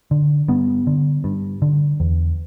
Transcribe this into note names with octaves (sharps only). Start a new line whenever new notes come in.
D3
G2 B3
D3
G2
D3
E2